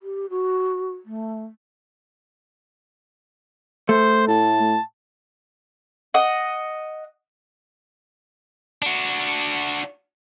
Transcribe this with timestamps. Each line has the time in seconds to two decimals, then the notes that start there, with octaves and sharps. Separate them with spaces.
0.01 G4
0.30 F#4
1.05 A3
3.89 A3 C5
4.28 A2 A5
6.14 D#5 F#5
8.82 D4 F#4